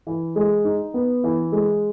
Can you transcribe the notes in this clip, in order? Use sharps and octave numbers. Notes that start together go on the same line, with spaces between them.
E3
G#3
D#4
B3
E3
G#3